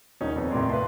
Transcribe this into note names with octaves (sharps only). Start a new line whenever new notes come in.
D#1 C#4 D#4
F2 B3
D#2 A2 C3 D5 C6
B4 E5 F5 A5 C6